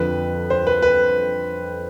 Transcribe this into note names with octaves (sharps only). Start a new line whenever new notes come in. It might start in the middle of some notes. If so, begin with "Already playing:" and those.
Already playing: F2 D3 F3 B4
C5
B4
B4